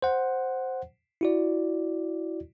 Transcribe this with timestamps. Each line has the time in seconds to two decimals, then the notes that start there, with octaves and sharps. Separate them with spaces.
0.02 C5 F#5
1.21 E4 F#4 D5